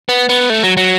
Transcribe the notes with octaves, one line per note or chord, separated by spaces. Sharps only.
B3
B3
A3
F#3
F#3